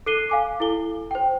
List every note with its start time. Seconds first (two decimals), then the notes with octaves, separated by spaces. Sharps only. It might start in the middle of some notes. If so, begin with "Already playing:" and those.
0.06 A4 F#6 C7 D#7 G7
0.30 F5 G#5 D6
0.60 E4 A4 G7
1.11 C5 G5